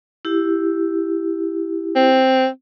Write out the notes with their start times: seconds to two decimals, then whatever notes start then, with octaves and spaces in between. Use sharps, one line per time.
0.25 E4 G4
1.95 C4